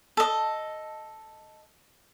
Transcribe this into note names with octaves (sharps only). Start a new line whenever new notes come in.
A4 D#5